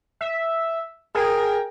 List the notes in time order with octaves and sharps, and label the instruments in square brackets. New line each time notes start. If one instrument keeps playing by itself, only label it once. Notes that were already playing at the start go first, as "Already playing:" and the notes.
[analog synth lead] E5
[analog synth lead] G#4 [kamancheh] A#4 G5